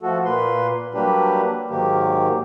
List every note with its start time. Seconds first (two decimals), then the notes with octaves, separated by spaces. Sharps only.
0.02 F3 A3 F#4 A4
0.25 A#2 A#3 B4 C6
0.94 F#3 G3 A#3 D4 G4 B4
1.70 G#2 D#3 F#3 A#3 G4